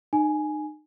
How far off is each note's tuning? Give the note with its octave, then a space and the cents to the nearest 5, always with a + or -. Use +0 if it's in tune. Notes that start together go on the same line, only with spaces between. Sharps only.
D#4 -35 G#5 +5